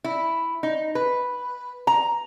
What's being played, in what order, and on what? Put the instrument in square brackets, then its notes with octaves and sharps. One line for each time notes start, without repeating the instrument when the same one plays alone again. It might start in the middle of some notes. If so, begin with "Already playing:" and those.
[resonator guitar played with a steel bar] E4
D#4
B4
A#5